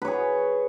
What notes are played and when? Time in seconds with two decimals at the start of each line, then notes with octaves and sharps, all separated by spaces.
0.02 B4
0.05 C#5
0.08 G#4